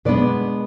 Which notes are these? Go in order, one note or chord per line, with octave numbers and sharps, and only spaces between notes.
B2 G#3 B3 D4 B4 D5